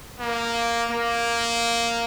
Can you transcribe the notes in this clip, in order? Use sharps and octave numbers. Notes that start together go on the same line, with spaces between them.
A#3
A#3